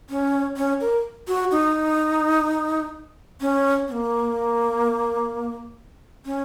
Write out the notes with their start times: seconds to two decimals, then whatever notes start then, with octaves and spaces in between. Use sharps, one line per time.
0.10 C#4
0.57 C#4
0.81 A#4
1.28 F#4
1.51 D#4
3.41 C#4
3.88 C4
3.92 A#3
6.25 C#4